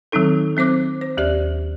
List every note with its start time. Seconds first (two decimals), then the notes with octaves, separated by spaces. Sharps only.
0.12 D#3 F#3 C4 D#4 A4
0.57 F#3 C4 C5 D6 F#6
1.01 C5
1.17 D#2 G4 D5